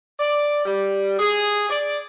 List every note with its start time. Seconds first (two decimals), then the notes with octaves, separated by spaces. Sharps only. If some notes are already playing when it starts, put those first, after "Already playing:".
0.19 D5
0.66 G3
1.19 G#4
1.70 D5